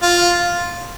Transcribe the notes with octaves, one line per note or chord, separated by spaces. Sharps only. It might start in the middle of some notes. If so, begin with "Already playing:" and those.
F4